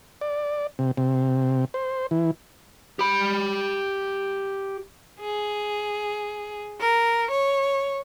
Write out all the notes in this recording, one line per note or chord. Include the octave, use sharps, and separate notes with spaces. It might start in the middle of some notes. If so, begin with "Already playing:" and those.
D5
C3
C3
C5
E3
G4 B5
G#4
A#4
C#5